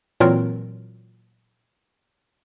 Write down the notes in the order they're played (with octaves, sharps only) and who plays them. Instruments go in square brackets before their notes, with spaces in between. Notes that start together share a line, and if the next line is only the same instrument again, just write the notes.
[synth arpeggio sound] A#2 E3 F#3 C4 F4 A#4